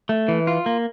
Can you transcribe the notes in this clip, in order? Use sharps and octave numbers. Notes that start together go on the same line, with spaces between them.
A3
E3
F4
A#3